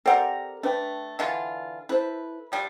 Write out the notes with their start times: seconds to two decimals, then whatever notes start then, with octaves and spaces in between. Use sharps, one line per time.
0.06 C4 G4 A4 A#4 D5 F#5
0.63 A3 D4 B4 G5
1.19 D3 E3 F4
1.89 E4 A4 B4 C5
2.52 F3 G3 D4